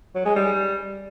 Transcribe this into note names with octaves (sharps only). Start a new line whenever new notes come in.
F#3
G#3
G3